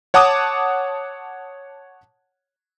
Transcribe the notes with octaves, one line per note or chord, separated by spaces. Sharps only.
C#5 F#5 A5 D6 D#6